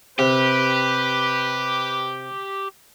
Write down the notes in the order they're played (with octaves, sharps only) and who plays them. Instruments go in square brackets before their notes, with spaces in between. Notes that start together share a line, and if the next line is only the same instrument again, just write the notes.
[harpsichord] C3 [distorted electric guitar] G4 [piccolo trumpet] B4